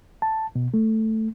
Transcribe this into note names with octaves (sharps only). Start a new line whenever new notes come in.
A5
B2
A3